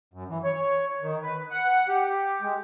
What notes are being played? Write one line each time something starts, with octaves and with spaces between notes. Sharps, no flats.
F#2
E3
C#5
D#3
B4
F#5
G4
G#3